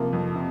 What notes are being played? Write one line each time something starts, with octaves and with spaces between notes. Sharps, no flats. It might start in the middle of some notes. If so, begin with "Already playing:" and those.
Already playing: C3 F3 A#3
F2
C3